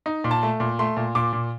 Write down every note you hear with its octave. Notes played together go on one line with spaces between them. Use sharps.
D#4
A#2
A5
A3
A#2
A3 C6
A#2
A#2 D6
A#2